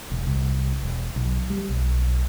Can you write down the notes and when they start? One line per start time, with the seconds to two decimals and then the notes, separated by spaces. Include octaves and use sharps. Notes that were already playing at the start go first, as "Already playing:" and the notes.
0.12 E1
0.27 C2
0.83 E1
1.16 B1
1.50 G3
1.69 B1